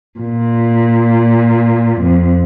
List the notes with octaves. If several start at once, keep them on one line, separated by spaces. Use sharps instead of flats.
A#2
F2